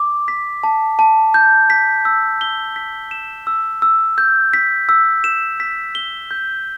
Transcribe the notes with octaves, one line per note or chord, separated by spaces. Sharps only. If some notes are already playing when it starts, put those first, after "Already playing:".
Already playing: D6
B6
A5
A5
G6
B6
E6
G7
B6
E7
E6
E6
G6
B6
E6
E7
B6
G7
G6